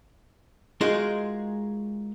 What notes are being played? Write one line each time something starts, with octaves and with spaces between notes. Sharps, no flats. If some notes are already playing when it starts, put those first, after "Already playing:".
G#3 D#4 F4 F#4 G#4 A#4